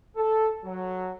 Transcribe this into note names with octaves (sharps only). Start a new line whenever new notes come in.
A4
F#3